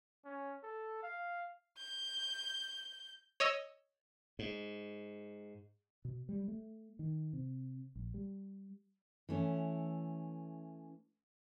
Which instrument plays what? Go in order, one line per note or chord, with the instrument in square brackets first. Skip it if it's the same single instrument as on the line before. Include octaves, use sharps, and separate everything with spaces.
[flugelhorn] C#4
A4
F5
[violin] G6
[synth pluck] C#5 D#5 E6
[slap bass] G#2
[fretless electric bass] B2
G3
A3
D#3
C3
A#1
G3
[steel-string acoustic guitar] E3 A3 C#4